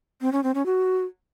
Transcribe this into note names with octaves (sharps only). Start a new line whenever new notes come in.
C4
C#4
C4
C#4
F#4